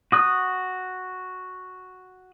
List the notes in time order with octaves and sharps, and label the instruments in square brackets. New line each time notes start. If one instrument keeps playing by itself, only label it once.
[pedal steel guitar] F#4 D#6 F#6